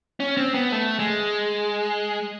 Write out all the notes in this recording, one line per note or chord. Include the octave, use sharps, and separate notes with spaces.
C#4
C4
B3
A3
G#3